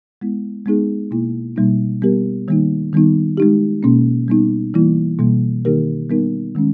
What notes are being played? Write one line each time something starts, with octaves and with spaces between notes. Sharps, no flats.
G#3 B3 E4
G#3 B3 D#4 G#4
B2 A#3 E4
B2 G3 A#3 D#4
G3 B3 G4 A#4
D#3 G3 A#3 D#4
D#3 G3 B3 D#4
G#3 D#4 G4
B2 A#3 C#4
G3 B3 D#4
E3 G3 A#3 E4
B2 G3 A#3
D#3 A#3 D#4 G4 A#4
G3 B3 D#4 A#4
D#3 G#3 C#4